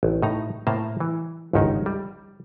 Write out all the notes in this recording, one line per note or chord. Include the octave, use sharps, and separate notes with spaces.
A1
A2 D#4 A#5
A2 A#3 C5 A5 A#5
E3
G1 C#2 G#2 D#3 C#4 D#4
G3